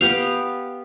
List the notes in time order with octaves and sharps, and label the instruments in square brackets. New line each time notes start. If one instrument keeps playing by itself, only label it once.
[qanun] B3 G4 F5